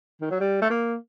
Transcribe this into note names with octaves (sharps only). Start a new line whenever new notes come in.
D#3
F#3
G3
A3
A#3